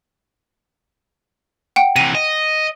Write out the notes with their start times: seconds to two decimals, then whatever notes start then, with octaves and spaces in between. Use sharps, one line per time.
1.76 F#5 G5
1.96 C3 E3 D#7
2.15 D#5